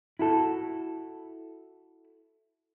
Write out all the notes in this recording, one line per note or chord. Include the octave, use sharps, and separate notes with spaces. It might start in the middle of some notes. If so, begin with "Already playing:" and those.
E4 F#4 A4